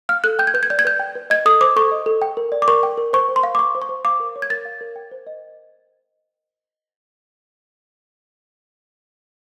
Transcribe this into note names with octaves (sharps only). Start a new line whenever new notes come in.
F5 F6
A4 F#6
G5 G6
G#6
B4 G6
G#6
D5 G6
G#6
B4 G6
G5
B4
D#5 G#6
A4 D#6
C5 D6
A4 C#6
D#5
A4
G5
A#4
D5
D6
A#4 C#6
G5
A#4
C5 C#6
C5
C6
F5
D6
F5 C#6
C5
C#6
C5
F5 D6
A#4
C#5
G#6
A#4 A6
F5
A#4
G5
C5
D#5